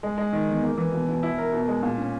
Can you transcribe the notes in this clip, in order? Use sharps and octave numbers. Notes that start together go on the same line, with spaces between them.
G#3
G#3
D#3
E2
A#3
E3
B2
B2
E4
A#4
B2
G#3
A#2
C#4